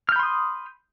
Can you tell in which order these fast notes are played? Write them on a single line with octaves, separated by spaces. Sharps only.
F6 G6 B5 C6 D#6